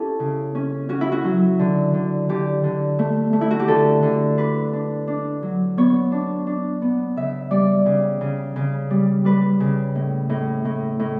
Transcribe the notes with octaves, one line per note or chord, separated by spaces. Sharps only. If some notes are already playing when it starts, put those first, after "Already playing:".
Already playing: C#4 E4 G4 A4
C#3
C#4
C#4 F#4
E4
F#4
F#3
D3
D3
D3 G4
D3
A3
A3
E4
F#4
G4
D3 A4
D3
D4 B4
D4
D4
F#3
B3 C#5
D4
D4
B3
C#3 E5
G3 D5
C#3
C#3
C#3
G3
G3 B4
C#3
A2
A2
A2
A2